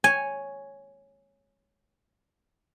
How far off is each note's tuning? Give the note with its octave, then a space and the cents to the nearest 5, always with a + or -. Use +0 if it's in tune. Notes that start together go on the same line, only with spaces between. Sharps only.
C#5 +0 G#5 +0